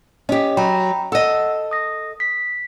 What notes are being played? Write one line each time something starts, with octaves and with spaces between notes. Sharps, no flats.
C#4 G4 D#5
F#3 G5 A#5 B5
A4 D#5 F#5 E6
D#6 A#6
B6